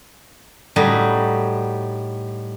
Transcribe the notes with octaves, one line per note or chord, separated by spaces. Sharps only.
A2 G3 D#4 F#4